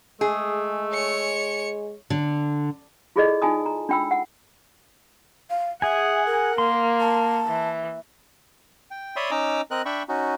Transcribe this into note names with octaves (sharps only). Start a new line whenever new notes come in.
G#3 A3 G#4
C#5 C#7
D3
E4 F4 G#4 A4 D5 D#5
D#4 F4 G#5 A5 D#6
A#5
D4 F4 G5 B5 E6
F#5
F5
G#4 E5 F#5 G#5
A#4
A#3 C6
A5
E3
G5
C#5 D5 E5 B5 C6 D#6
C#4 D#4 D#5 A#5 D6 E6
C4 A#4 D#5 F#6
D4 E5 G5 B5 C#6
C#4 D#4 F#4